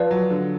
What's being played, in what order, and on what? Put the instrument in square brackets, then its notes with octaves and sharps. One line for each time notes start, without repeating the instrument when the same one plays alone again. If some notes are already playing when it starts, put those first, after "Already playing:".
Already playing: [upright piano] F3 [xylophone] B4 D5 F5
[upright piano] F#3
D3